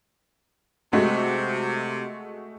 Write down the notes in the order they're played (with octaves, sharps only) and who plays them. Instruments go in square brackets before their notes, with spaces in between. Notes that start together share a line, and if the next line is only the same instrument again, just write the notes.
[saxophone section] C3 [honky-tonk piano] G#3 A3 F#4